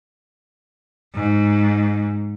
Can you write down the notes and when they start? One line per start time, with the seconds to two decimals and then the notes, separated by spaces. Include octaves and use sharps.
1.14 G#2